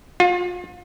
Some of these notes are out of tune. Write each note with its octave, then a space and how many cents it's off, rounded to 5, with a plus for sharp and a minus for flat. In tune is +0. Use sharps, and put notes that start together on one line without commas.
F4 +35